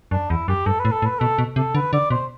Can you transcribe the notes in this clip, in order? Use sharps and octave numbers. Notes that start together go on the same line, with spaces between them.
F#2 D4
E2 E4
F#2 G4
G2 A4
B4
A2
A4
A2
B4
B2 A4
B2
C3 A4
D3 B4
D3 D5
B2 C5